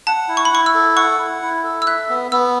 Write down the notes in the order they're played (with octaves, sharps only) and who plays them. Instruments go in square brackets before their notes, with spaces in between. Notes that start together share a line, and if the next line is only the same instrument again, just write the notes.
[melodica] F#5 [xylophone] A5
[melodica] E4
[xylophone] C#6
B5
[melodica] E4 [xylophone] C#6
[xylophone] E6
[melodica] A4
[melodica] F#5 [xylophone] C#6
[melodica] E4
E4
A4
[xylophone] E6
[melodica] E5 [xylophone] F#6
[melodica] B3
[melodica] B3 [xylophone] E6